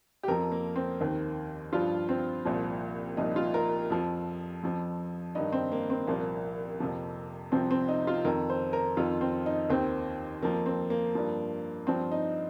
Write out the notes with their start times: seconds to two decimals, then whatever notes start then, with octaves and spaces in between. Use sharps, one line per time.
0.23 G4
0.28 F2 F3 A#4
0.52 A#3
0.76 C4
1.01 D#2 D#3
1.73 G2 F3 F4
2.09 C4
2.45 C2 A#2 F3
3.17 C2 A#2 F3 D#4
3.36 F4
3.54 A#4
3.90 F2 F3
4.63 F2 F3
5.35 G2 D#3 D#4
5.53 C4
5.72 A#3
5.90 C4
6.07 C2 A#2 F3 A#3
6.80 F2 C3 F3
7.52 C2 C3 F3 C4
7.71 C4
7.88 D#4
8.07 F4
8.24 F2 D#3 A#4
8.50 C5
8.73 A#4
8.97 F2 D#3 F4
9.21 C4
9.46 D#4
9.70 D#2 D#3 C4
10.43 F2 F3 A#3
10.66 C4
10.90 A#3
11.15 G2 F3
11.87 G2 F3 C4
12.12 D#4